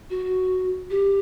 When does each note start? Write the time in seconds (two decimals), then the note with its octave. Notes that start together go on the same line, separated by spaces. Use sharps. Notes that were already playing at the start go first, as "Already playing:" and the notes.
0.10 F#4
0.90 G4